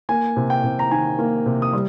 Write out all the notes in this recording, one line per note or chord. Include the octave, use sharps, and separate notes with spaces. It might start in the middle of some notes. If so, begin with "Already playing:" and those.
A#3 G#5
C3
G5
C3
A#5
D#3 G#5
A#3
C3
D#6
G3